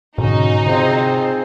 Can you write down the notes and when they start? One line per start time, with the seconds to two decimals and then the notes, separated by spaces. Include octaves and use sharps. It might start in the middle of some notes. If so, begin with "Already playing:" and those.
0.18 G#2 B2 D3 C#4 D#4 F#4
0.67 C3 C4 F4 G#4 C5